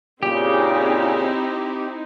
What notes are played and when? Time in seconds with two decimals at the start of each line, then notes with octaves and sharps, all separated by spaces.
0.23 A#2 C#3 C4 D#4 E4 G4 G#4